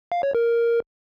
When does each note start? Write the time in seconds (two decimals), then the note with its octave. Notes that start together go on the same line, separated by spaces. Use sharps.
0.12 F5
0.23 C#5
0.35 A#4